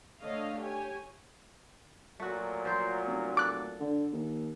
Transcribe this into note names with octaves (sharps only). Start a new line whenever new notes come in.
D3 A3 C#5 D#5 F5
G4 C#5 G#5
A#2 F#3 A3 F#4
F3 C5
F1
A4 D6 F#6
D3
D#2